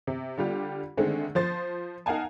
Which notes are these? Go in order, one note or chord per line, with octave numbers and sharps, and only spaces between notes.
C3
D3 G3 F4 G4
D3 D#3 G#3 A3 C4
F3 C5 A6
D#4 A#4 F5 F#5 G#5 A5